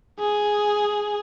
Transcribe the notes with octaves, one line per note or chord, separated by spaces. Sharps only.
G#4